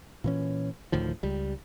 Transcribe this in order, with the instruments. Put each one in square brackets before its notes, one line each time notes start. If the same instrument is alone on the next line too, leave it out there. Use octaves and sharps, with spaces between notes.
[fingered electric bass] A#2 E3 C#4
D2 A2 D#3 F3
C#2 G3